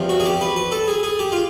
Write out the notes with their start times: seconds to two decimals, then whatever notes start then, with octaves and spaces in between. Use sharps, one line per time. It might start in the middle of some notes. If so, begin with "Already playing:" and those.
Already playing: E2 C3 F3
0.09 F#4
0.20 G#4
0.26 G4
0.41 B4
0.56 B4
0.72 A4
0.88 G#4
1.03 G#4
1.19 G4
1.32 F4